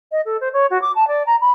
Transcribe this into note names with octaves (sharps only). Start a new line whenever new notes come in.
D#5
A4
C5
C#5
F#4
D6
A5
D5
A#5
B5